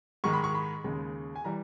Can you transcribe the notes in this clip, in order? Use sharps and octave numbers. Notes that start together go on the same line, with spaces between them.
G#2 D#3 G#3 C#6
B5
C#6
B5
D#2 C#3 G#3
G#5
E3 G3 A#5